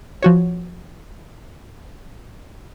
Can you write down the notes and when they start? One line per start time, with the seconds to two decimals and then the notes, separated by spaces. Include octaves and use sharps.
0.23 F3 F#4 C#5